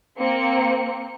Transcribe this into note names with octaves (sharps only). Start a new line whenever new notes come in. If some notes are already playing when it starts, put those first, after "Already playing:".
A#3 C4 C#7